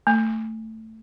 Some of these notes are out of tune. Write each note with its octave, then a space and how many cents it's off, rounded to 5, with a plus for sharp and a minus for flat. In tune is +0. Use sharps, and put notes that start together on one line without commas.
A3 +10